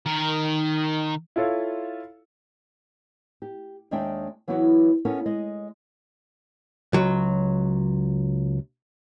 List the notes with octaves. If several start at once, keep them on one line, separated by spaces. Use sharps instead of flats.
D#3 A#4
E4 F4 A4 C#5 F5
G4
D#2 D#3 G#3 D4 E5 G5
E3 F#3 B3 E4 F#4
B3 C#4 E4 A4 A#4 C#5
G#3 D#5
C#2 F#3